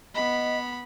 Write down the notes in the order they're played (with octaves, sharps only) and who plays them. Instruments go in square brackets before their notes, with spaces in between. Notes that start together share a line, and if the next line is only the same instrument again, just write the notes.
[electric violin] B3 B5 [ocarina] D#5